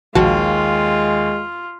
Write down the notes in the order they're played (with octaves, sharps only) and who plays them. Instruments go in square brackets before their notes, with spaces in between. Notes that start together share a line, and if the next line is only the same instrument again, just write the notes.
[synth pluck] A#1 F#4 A5 [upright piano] D#2 [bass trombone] G#3 [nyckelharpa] F4